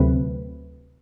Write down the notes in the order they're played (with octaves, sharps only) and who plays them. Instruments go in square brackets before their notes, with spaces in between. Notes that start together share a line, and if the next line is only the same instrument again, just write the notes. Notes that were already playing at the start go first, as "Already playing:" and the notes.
Already playing: [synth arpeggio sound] D2 C3 F#3 A3 C4 B4